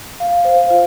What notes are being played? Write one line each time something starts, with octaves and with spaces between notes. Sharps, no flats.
F5
C5
F4